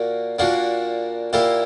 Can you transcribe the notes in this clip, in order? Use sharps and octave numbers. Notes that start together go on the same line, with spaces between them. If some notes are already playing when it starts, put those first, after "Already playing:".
Already playing: A#2 A#3 F#4
A#2 A#3 D4 F#4
A#2 A#3 E4 G4